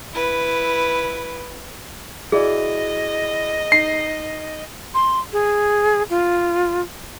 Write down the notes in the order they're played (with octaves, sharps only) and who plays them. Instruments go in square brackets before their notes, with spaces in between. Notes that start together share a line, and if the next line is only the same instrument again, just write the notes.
[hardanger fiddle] E4 B4
[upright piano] E4 F#4 D5 [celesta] G#4 [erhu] D#5
[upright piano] D#4 [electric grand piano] C7
[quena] C6
G#4
F4